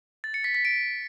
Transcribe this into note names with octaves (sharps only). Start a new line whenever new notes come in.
A6
C#7
B6
B6
D7